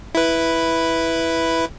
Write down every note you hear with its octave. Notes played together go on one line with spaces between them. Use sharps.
E4 B4